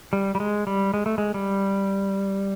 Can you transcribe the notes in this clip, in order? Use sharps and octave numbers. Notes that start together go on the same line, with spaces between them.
G3
G3
G#3
G3
G#3
A3
G#3
G3